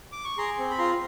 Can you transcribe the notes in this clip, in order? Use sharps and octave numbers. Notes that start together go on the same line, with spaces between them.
D6
C#6
G#4 A#5 C6
C4
B5
F4 A#5 C6